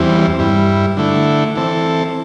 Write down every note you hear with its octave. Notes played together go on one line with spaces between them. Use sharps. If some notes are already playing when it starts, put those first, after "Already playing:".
Already playing: E2 E3 G3 C4
G2 G3 E4
D3 A3 E4
E3 C4 A4